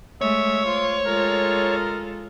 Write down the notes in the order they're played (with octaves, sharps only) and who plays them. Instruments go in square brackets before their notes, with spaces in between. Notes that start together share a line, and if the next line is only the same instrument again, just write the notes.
[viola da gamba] G#3 A3 [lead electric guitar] C#5 [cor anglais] E5
[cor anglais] F4 [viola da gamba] C5
[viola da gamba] G#3 F4 A4 [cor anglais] A#4